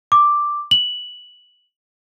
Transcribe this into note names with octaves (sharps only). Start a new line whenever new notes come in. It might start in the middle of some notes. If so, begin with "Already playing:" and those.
D6
F#7